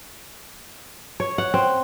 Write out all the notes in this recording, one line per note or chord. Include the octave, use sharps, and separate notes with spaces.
C#5
F#5
C4